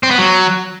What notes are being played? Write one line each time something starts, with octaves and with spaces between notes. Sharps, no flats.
C4
B3
F#3